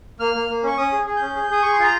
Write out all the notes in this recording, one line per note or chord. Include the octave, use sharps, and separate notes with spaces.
A#3 F6
A#3
A#3
C#4 C#6
C#4 D#6
G#4
G#4
C#4 G6
G#4
G#4 D#6
G#4 C#6
C6
F4 A#5